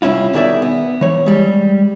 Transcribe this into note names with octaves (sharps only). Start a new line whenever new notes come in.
C2 G#2 C#4 E4 F4
B2 D#3 G#4 D5 E5
B3
E3 C#5
G3 G#3